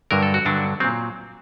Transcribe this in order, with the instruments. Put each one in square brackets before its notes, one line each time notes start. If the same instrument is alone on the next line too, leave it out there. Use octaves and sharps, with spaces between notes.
[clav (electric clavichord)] G2 D3 F#3 A#4
A4
F#4
G2 D3 F#3 D4
F#3 C4
A#2